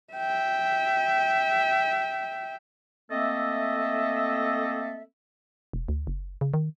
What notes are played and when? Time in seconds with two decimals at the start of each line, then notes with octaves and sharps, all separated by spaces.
0.13 E5 G5
3.11 A3 A#3 C4 A4 D#5 E5
5.73 E1
5.89 D2
6.07 F#1
6.41 C#3
6.54 D#3